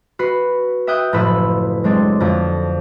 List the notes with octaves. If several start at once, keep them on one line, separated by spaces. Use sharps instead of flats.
F#4 B4 C7
E5 G5 D#6 F#6 G6
F#1 A2 F3 E4 B4 E6
F#3 G#3 C4 D4
F2 D3